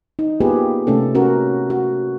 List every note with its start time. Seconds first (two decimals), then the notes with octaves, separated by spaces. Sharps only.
0.19 D#4
0.41 A#3 B3 F4 G4 G#4 B4
0.87 C3 A3 C#4 A4
1.15 C#4 F#4 A#4
1.70 F#4